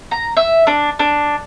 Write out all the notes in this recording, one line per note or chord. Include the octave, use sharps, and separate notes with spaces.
A#5
E5
D4
D4